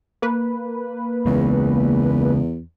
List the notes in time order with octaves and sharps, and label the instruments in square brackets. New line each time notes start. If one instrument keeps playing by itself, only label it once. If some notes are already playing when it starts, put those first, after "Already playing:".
[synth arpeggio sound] A#3 B4
[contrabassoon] E2 [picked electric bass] C#3 G#3